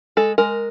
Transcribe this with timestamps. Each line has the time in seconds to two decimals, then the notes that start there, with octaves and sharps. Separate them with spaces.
0.17 G#3 A4
0.38 G#3 A#4